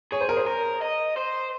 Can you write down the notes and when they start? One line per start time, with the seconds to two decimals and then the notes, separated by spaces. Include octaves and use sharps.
0.12 G#4 C#5
0.21 C5
0.29 A#4
0.37 C5
0.47 A#4
0.82 D#5
1.17 C5